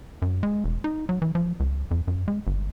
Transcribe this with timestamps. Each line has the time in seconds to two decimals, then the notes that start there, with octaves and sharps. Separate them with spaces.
0.22 F#2
0.43 G#3
0.64 E1
0.84 D#4
1.09 F#3
1.22 E3
1.35 F3
1.60 C#2
1.91 F2
2.08 F#2
2.28 G#3
2.47 G1